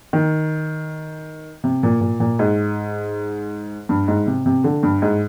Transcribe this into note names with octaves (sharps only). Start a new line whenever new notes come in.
D#3
C3
A#2
A#2
A#2
G#2
G2
G#2
C3
C3
D3
G2
G#2